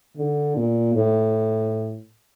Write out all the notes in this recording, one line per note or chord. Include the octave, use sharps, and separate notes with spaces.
D3
A#2
A2